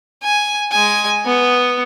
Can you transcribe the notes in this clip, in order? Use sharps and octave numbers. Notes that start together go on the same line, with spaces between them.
G#5
G#3 G#5
B3